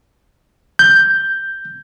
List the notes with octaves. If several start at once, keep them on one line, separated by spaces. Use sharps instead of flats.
G6